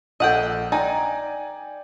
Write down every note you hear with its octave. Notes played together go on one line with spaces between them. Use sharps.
A#1 A4 D#5 F#5 G5
D#4 D5 G5 G#5